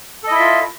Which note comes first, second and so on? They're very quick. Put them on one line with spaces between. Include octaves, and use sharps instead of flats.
A4 D#5 E4 E5 F4